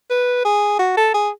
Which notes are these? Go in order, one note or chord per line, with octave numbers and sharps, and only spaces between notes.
B4
G#4
F#4
A4
G#4